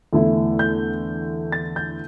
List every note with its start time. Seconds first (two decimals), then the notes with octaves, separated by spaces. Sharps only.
0.13 E2 D3 A3 E4
0.59 G6
1.52 A6
1.76 G6